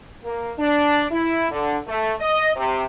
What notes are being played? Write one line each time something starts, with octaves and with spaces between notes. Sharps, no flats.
A#3
D4
E4
D3
A3
D#5
C3